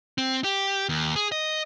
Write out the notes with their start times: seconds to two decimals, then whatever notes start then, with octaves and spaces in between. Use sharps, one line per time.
0.18 C4
0.44 G4
0.89 D#2
1.16 G#4
1.32 D#5